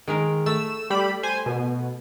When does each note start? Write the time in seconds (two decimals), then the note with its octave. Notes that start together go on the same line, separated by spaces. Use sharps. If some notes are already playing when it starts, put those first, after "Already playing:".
0.08 D#3 G#3 A#4
0.46 A3 E6
0.90 G3 G4 B5
1.23 C5 G#5
1.46 B2